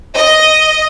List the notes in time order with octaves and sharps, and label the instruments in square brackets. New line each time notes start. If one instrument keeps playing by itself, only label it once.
[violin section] D#5